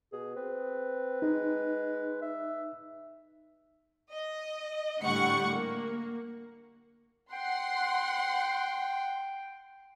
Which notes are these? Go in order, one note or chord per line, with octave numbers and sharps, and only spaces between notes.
B2 G#4
C4 B4
G#3 D#4
E5
D#5
A2 D3 G3 F#5 C#6 C#7
A#3
F#5 G5 C6